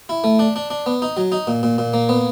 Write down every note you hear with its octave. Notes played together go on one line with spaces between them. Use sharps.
E4
A3
D4
D4
D4
B3
D#4
F#3
D#4
A#2
A#2
A#2
A#3
B3